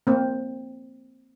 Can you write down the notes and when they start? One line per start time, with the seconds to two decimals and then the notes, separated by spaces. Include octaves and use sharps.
0.07 A#3 C4